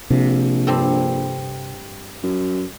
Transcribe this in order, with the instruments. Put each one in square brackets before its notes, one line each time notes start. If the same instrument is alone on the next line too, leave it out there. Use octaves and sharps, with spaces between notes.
[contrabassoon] A#1 [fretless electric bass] C3
[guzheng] G2 C4 A4
[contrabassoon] F#2